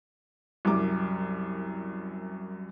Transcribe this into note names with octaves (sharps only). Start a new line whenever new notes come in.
C2 F#2 D6